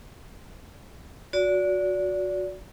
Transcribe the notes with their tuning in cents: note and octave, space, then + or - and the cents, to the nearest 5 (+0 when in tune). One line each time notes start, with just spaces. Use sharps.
F#4 -20 D5 -25